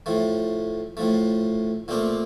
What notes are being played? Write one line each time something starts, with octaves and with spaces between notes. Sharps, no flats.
A2 F3 A3
A2 F3 A3
A#2 A3 C4 G4 A#4